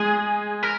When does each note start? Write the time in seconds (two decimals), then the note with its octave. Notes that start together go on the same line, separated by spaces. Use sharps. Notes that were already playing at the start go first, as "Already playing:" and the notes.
Already playing: G#3 G#4
0.63 A#4